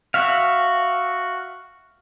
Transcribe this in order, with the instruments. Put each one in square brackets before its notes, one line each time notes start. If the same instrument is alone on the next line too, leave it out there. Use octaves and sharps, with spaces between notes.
[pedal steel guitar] F#4 E5 F5